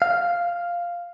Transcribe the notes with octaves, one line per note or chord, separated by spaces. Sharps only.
F5